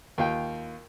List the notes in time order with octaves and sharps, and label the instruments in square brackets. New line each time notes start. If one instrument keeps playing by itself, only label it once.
[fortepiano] D#2 F4 G5